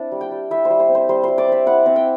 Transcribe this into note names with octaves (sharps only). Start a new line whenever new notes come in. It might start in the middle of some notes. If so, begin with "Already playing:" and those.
Already playing: C4 D4 E4 D5 A5
G3
G5
G3
E4 E5
C5
G3
C5
C4
C5
G3 C5
G3 C5
D5
C4 E5
E4 F#5
C4
G5